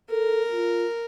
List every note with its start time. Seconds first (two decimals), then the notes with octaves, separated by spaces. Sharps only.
0.11 A4 A#4
0.51 F4